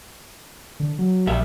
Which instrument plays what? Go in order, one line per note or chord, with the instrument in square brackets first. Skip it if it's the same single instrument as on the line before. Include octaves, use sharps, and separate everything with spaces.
[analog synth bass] D3
F#3
[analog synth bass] A#1 [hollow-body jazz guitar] G3 E5